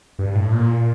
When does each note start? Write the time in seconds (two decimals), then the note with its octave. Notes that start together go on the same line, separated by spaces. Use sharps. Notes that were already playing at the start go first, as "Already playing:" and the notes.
0.19 G2
0.35 A2
0.52 A#2